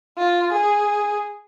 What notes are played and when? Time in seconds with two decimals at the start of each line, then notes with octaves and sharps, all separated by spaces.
0.18 F4
0.52 G#4